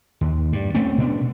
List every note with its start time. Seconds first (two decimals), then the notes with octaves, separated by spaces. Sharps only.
0.21 D#2
0.53 G2
0.75 A3 C4 C#4
0.98 B2 B3 C#4 D4